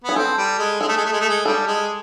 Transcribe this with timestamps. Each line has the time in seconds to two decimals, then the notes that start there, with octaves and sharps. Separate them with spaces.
0.04 B3 G#4
0.16 C4 A4
0.38 G3
0.58 G#3
0.80 G#3 A4
0.88 A3
0.96 G#3
1.05 A3
1.13 G#3
1.21 A3
1.29 G#3
1.45 G3 A4
1.67 G#3